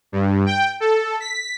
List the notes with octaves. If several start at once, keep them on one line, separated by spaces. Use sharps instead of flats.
G2
G5
A4
B6